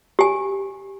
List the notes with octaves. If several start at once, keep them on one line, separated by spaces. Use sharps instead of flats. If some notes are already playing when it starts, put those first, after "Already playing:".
G4 G#5